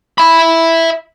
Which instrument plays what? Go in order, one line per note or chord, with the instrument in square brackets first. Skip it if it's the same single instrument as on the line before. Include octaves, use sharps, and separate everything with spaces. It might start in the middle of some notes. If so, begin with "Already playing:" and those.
[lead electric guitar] E5 B5